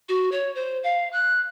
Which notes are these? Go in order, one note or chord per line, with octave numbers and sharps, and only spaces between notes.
F#4
C#5
C5
F5
F#6